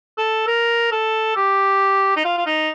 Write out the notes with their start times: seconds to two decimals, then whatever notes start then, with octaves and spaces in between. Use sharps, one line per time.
0.18 A4
0.47 A#4
0.92 A4
1.36 G4
2.16 D#4
2.24 F4
2.37 F4
2.46 D#4